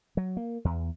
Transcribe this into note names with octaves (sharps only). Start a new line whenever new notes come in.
F#3
A#3
E2